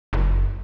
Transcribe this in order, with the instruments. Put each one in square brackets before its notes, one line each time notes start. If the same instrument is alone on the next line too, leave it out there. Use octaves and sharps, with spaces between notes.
[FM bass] F#1